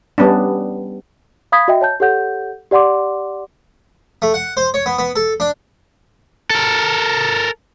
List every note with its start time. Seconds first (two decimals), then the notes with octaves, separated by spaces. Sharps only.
0.18 G3 B3 C#4 D4
1.52 F5 B5 D#6 G#6 B6
1.68 F#4 D#5 E5 G5
1.81 C#5 A5 G6
2.00 G4 A4 C#5 F#5 G6
2.71 G4 D5 F#5 C6 D6
4.22 A3
4.34 F#5
4.57 C5
4.74 C#5
4.86 B3
4.98 B3
5.16 A4
5.40 D4
6.50 A4 A#4